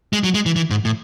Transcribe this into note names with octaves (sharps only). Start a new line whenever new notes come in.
G#3
F#3
G#3
E3
E3
G#2
A2